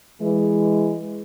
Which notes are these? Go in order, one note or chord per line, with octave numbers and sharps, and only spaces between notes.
E3 G#3